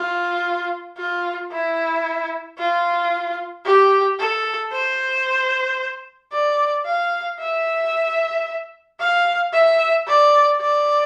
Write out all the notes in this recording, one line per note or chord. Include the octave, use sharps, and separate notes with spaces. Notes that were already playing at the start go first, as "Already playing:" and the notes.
Already playing: F4
F4
E4
F4
G4
A4
C5
D5
F5
E5
F5
E5
D5
D5